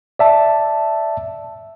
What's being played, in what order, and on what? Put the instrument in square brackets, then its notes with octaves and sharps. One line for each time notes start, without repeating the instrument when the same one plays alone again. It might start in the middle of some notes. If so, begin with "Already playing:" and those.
[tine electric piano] D5 E5 A5